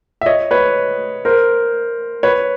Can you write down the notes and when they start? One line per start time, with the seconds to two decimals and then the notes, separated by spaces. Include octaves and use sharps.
0.21 E5
0.26 C#5 D#5
0.51 B4 C#5
1.25 A#4 C5
2.23 B4 C#5